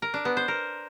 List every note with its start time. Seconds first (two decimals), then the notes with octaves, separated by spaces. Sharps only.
0.02 A#4
0.14 D4
0.25 B3
0.37 C5
0.48 A#4